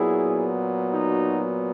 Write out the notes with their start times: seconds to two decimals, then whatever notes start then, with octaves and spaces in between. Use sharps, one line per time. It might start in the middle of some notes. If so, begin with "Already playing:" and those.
Already playing: A#2 F#3 B3 E4 G#4
0.94 D#4 F#4